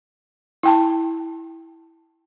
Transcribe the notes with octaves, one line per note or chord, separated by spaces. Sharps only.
E4 G5 A5